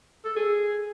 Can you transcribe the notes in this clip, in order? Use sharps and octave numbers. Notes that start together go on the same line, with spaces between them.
A4
G#4